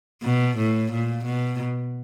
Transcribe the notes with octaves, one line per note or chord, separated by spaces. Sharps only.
B2
A2
A#2
B2